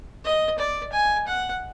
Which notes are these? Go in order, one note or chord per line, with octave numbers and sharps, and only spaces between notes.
D#5
D5
G#5
F#5